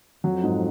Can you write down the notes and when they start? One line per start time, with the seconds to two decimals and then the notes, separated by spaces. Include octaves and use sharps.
0.24 F2 F#3
0.43 G#2